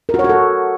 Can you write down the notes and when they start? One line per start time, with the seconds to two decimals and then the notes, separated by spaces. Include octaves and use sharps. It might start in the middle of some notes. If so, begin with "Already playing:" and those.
0.09 A#4
0.14 F#4
0.19 C#5
0.24 F#4
0.29 A4